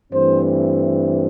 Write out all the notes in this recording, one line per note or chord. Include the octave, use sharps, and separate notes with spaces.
G2 E3 A3 C4 C5